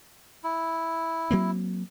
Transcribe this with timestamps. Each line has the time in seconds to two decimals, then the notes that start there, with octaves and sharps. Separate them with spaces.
0.44 E4
1.31 F#3 A#3 C4